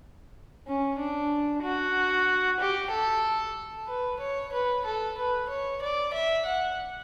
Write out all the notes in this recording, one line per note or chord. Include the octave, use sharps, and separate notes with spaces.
C#4
D4
F#4
G4
A4
B4
C#5
B4
A4
B4
C#5
D5
E5
F#5